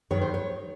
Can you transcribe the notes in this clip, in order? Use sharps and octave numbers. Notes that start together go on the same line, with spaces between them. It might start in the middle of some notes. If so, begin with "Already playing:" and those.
G2 D#3 F#3 C#5
C5
C#5